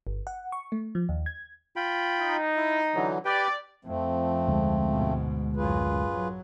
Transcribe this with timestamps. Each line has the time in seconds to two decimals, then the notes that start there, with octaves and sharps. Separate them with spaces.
0.07 G1
0.27 F#5
0.52 C#6
0.72 A3
0.95 F3
1.09 D#2
1.26 G#6
1.76 F4 G5 B5
2.19 D#4
2.57 E4
2.95 D3 E3 F#3
3.25 G4 B4 D5 G5
3.85 F2 F3 A3 C4
4.48 D2 D3 G#3
4.90 G#2 B2
5.56 A1 F#2 F4 G#4 B4
6.12 F#3